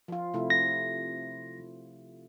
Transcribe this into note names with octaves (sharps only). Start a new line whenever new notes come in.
F3 F4
C3 A3 E4
A#6